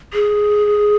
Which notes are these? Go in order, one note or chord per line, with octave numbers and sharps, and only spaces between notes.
G#4